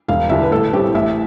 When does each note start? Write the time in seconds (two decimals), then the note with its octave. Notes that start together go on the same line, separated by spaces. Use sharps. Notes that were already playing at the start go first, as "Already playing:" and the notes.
0.08 E1 F5
0.29 E2 D3 G3 D4 E5
0.43 B4
0.51 A1 A4
0.73 A2 G3 C4 G4
0.95 A1 E5